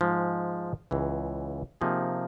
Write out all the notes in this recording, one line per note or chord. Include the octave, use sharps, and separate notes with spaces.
G#2 F3 G#3
C#2 C#3 E3
C3 F3 A#3 D#4 G#4